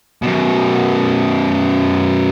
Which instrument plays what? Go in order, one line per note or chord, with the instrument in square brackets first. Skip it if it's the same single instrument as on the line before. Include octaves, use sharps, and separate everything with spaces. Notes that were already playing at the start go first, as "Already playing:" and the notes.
[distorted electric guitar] F#2 B2